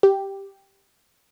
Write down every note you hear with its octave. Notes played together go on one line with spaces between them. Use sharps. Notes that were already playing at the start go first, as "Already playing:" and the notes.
G4